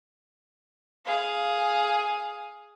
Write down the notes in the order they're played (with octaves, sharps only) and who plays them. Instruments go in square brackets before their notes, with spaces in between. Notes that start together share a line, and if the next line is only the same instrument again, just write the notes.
[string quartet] G#4 F5